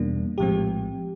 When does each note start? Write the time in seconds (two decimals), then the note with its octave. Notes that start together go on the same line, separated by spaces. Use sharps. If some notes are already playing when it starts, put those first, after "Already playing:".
Already playing: E2 B2 G3 A#3 D4
0.38 A#1 A2 F3 G#3 C4 G4